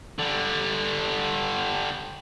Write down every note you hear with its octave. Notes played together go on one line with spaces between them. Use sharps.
D3 G3